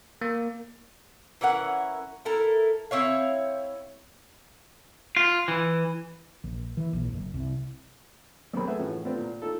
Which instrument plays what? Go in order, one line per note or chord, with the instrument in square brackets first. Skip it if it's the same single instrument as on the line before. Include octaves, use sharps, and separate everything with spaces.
[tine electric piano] A#3
[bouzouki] E3 C#4 A#4 F#5
E4 A4 A#4
C4 E4 C#5 F5
[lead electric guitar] F4
E3
[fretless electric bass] A#1
E3
A#1
F#1
C2
[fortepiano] B1 F#2 A#3 C4 G#4 B5
A3 G#4 B4 E5 F#5
A2 E3 F3 C#4
A3 B3 C4 D4 F4
A#2
D#4 F4 A4